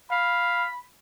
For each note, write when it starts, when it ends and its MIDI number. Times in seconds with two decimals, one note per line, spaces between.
0.11 0.70 77
0.11 0.83 83